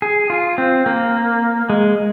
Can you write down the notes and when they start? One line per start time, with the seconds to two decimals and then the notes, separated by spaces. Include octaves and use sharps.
0.02 G#4
0.30 F4
0.58 C4
0.86 A#3
1.70 G#3